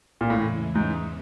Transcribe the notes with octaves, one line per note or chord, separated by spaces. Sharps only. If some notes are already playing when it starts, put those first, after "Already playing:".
A#2
E2 A2 C#3 E3 G#3
G#2